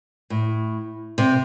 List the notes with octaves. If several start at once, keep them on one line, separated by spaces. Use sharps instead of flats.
A2
C3